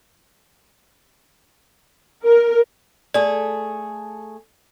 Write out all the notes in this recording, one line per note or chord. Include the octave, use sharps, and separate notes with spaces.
A#4
A3 G#4 D5